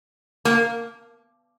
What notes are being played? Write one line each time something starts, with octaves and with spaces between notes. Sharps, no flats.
A#3